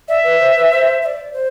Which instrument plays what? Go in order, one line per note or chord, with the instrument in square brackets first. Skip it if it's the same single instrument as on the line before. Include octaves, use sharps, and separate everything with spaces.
[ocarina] D5 [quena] E5
[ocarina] B4
C5
B4
C5
E5
D5
C5